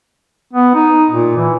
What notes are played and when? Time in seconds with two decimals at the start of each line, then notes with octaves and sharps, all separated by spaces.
0.53 B3
0.74 D#4
1.11 A#2
1.37 E3